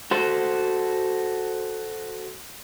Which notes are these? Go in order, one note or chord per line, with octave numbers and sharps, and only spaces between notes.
F#4 A4 C5